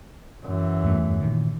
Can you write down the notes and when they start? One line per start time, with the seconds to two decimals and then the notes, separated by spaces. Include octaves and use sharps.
0.44 F#2 E3
0.84 E2 G2 A3
1.21 A#2 D#3